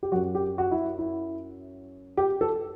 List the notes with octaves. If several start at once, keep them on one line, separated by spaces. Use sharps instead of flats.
G4
F#2 F#3 F#4
G4
F#4
E4
E4
G4
A4